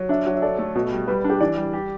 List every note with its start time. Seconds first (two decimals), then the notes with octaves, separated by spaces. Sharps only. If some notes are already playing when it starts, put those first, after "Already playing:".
Already playing: F#3
0.09 D4 E5
0.26 F#3
0.35 E5
0.42 A4 D5
0.58 A3
0.75 B2
0.92 G3
1.08 G3 B4
1.24 D4
1.30 G4
1.41 E3 D5
1.57 G3
1.73 G4